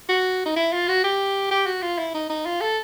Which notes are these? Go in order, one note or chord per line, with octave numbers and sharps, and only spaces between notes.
F#4
D#4
E4
F4
F#4
G4
G4
F#4
F4
E4
D#4
D#4
F4
A4